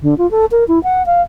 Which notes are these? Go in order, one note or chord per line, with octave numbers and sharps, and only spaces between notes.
D3
F4
A4
A#4
E4
F#5
F5